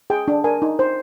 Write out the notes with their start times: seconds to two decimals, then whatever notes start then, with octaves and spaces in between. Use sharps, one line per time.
0.10 G#4 G5
0.28 D4
0.44 A#4 G#5
0.62 D#4
0.79 C5